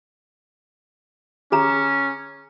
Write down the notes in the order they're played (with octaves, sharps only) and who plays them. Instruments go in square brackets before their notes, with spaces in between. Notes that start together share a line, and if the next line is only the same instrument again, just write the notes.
[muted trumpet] C#4 [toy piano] G#4 A#5